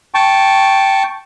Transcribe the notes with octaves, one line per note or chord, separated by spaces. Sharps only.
G5 A5 C#6